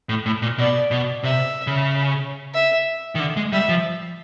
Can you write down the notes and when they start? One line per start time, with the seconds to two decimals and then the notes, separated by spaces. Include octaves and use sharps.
0.09 A2
0.26 A2
0.42 A#2
0.58 B2 D5
0.91 B2
1.23 C3 E5
1.67 C#3
2.54 E5
3.15 D#3
3.20 D3
3.37 G#3
3.52 G3 E5
3.69 F3